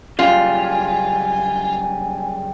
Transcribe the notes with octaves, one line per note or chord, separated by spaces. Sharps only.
F#2 C#3 G3 F4 G#5